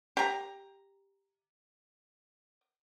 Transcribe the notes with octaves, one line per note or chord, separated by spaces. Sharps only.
G4 A#5